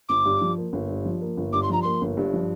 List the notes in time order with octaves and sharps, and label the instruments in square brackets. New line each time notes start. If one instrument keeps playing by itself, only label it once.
[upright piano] G1 [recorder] D6
[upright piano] G2
F3
A#3
G1
G2
F3
A#3
G1
[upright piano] G2 [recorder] D6
[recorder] C6
[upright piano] F3 [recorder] A#5
[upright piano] A#3 [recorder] C6
[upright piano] G1
G2
F3